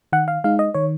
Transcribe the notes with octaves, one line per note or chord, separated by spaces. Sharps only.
D#3 F#5
F5
G#3 D#4 F5
D#5
D#3 C#5